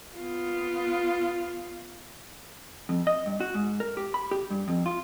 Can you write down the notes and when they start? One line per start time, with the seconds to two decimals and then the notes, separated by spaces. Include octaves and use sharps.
0.17 B3 F4
2.89 F2
3.07 D#5
3.26 G2
3.40 F#4
3.55 G#2
3.80 A#4
3.97 G4
4.14 B5
4.31 G4
4.50 G2
4.68 F2
4.86 F4